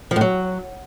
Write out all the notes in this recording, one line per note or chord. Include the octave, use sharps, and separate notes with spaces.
F3
A2
F#3